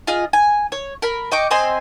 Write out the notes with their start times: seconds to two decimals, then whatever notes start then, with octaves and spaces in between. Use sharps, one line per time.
0.07 F4 G#4 D#5
0.33 G#5
0.72 C#5
1.02 A#4 B5
1.31 D#5 G5 C#6 D6
1.51 C4 D#5 G#5 C6